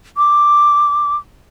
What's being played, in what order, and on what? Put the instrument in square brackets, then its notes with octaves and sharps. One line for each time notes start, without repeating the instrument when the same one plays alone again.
[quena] D6